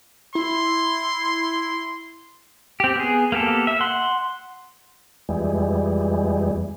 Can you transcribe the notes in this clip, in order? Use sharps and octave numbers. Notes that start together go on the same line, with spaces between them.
E4 C6
C4 G4
B3 G#4
A#3 B3 G4 A4
E5
F#5 C6
F2 E3 G3 G#3